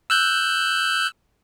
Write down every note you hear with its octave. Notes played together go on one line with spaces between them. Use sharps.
E6 F#6 G6